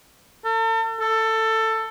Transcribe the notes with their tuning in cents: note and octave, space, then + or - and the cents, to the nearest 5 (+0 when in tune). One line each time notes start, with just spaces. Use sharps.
A4 +40
A4 +15